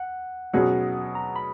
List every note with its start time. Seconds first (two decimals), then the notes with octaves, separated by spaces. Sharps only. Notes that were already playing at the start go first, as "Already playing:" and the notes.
Already playing: F#5
0.53 B2 F#3 C#4 G#4 F#5
1.15 A#5
1.36 B5